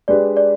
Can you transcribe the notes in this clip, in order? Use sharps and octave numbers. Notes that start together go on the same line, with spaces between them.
G#3 D4 G4 B4 D5
D5